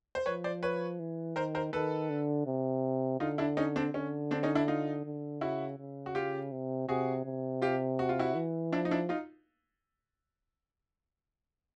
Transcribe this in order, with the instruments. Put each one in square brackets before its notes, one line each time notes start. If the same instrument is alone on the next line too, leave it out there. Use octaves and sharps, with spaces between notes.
[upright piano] C5
[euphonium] F3 [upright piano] B4 C#5
[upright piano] C5 D5
B4 C#5
[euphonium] E3
[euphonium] D#3 [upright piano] A#4 C5
[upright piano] A#4 C5
[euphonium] D#3 [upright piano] A4 B4
[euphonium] D3
C3
[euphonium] D3 [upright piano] D#4 F4
[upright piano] D4 E4
C#4 D#4
C4 D4
[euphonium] D3 [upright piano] C#4
[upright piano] C4 D4
C#4 D#4
D4 E4
D#4 F4
[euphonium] D3
[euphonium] C#3 [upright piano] E4 F#4
[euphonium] C#3
[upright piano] F#4
F4 G4
[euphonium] C3
[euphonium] C3 [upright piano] F#4 G#4
[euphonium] C3
[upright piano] F4 G4
F#4
F4
E4 F#4
[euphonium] E3
[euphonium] F3 [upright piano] D4 E4
[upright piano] D#4
D4 E4
D#4 F4